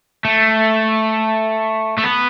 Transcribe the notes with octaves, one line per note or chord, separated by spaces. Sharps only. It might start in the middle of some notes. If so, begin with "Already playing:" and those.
A3
A3
B3